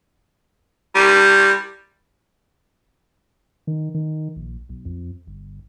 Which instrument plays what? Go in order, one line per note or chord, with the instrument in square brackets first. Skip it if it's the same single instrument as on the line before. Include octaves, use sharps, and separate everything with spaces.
[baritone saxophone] G3
[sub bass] D#3
D#3
A#1
B1
F2
G1